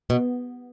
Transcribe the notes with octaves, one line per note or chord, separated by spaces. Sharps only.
B2